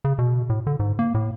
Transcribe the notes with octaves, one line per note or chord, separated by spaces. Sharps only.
C#3
B2
A2
D3
G#2
A#3
A2